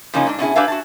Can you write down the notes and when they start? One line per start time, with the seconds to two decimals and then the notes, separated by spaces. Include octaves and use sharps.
0.14 C#3 F3 A#3 C#4 D#4 F4
0.27 G#2 D4
0.39 B2 C#4 E4 G#4
0.56 D4 G4 B4 E5 F5 G#5
0.68 F#4 A5